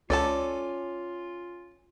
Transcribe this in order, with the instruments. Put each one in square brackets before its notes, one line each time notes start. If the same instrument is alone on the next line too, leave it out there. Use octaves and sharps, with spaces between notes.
[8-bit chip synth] C#2 A4 D6 [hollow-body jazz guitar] C#4 [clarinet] F4 [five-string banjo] D5 A5